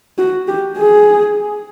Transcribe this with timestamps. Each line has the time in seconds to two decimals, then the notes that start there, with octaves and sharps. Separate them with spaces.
0.18 F#4
0.48 G4
0.78 G#4